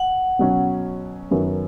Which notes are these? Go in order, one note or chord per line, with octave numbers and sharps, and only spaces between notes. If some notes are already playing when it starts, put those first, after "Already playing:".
Already playing: F#5
B2 F#3 C#4
F#2 D#3 F#3 B3